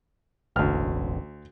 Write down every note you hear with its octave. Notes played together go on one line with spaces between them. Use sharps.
E1 A1 D2 F6